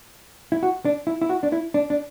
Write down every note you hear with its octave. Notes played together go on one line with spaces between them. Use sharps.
E4
F#4
D4
E4
E4
F#4
D4
E4
D4
D4